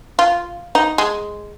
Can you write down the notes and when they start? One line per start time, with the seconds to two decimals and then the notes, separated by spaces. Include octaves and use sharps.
0.19 F4
0.75 D#4
0.98 G#3